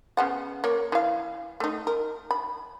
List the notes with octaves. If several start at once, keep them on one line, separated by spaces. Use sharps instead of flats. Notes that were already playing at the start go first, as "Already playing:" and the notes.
C#3 B3 F#5
A#3 C#5
E3 F5
A3 D#4
A#4
B5